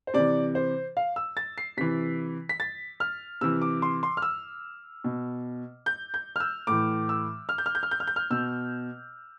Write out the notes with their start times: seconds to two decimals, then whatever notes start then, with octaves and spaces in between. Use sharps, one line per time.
0.07 C5
0.14 C3 E3 D5
0.55 C5
0.97 F5
1.16 E6
1.37 A6
1.58 C7
1.77 C3 E3 B6
2.49 B6
2.60 A6
3.00 F6
3.41 C3 E3 E6
3.62 D6
3.82 C6
4.03 C6
4.17 F6
4.22 E6
5.04 B2
5.86 G6
6.14 G6
6.36 F6
6.40 E6
6.67 A2 E3 D6
7.09 E6
7.49 F6
7.58 G6
7.66 F6
7.75 G6
7.83 F6
7.91 G6
8.00 F6
8.07 G6
8.16 F6
8.30 B2 E6